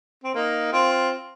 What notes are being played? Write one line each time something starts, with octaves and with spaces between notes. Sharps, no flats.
C4
A#3 D#4
C4 F4